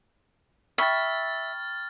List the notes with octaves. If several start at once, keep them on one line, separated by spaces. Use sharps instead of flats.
E5 G5 B5 C#6 F6 A6